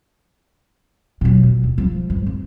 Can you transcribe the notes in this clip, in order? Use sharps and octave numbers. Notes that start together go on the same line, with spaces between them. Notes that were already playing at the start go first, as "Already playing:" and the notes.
B2 F#3
B2
D1
F3 G3
G2
C4